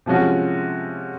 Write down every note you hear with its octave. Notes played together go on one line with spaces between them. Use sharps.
C3 F3 G#3 C#4 F#4